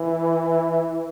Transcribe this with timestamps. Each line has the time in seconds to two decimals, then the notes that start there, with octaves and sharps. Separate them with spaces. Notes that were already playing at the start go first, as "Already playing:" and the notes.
Already playing: E3